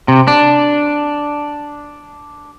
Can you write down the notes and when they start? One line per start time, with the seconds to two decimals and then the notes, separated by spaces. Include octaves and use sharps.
0.08 C3
0.28 D4